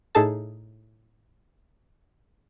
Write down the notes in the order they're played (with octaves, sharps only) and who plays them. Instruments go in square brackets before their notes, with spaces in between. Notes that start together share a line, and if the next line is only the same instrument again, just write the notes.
[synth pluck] A2 D#4 G#4 A4 A5